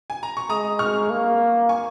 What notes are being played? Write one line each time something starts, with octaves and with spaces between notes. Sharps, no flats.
G#5
A#5
C#6
G#3 A#5 D#6
C#6 F6
A#3
G#5 C#6